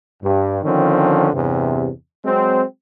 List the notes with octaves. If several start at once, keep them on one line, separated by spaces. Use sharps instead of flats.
G2
D3 D#3 F3 C4 C#4
E2 G2 C3
F#3 G#3 C4